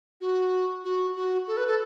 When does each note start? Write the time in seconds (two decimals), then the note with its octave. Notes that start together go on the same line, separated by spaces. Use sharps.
0.21 F#4
0.85 F#4
1.16 F#4
1.47 A4
1.57 B4
1.68 A4